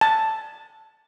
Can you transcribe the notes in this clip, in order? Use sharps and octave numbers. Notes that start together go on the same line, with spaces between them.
A5